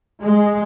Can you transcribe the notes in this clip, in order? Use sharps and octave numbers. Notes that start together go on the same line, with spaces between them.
G#3